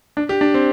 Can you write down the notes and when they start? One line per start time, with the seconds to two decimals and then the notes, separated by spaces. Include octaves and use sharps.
0.17 D4
0.29 G4
0.41 D4
0.54 C4